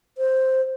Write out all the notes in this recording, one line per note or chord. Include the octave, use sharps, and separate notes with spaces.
C5